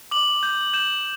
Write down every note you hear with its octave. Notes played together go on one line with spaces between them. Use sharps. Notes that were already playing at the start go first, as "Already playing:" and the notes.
D6 F#7
G6
G6 E7